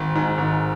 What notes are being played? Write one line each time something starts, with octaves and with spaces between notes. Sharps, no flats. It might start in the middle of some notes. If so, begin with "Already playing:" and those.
Already playing: G#1
G#2
G#1